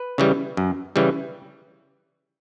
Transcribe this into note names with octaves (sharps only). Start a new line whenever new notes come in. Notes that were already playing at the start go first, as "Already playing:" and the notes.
Already playing: B4
C#3 E3 G3
F#2
C#3 E3 G3